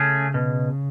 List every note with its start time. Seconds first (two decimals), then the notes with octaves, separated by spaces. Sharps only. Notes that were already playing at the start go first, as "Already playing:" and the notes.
Already playing: C#3 A3 C#4 G#4
0.34 B2